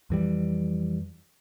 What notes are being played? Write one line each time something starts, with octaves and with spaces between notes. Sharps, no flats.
F2 E3 G3